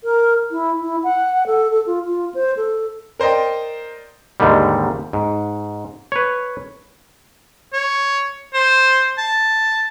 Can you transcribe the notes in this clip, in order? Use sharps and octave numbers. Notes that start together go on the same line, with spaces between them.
A#4
E4
E4
F#5
A4
A4
F4
F4
C5
A4
A#4 C5 D5 D#5 G5
D#2 G#2 D3 D#3 G3
G#2
B4 C#5
C#5
C5
A5